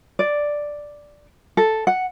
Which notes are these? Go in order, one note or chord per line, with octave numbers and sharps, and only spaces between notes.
D5
A4
F#5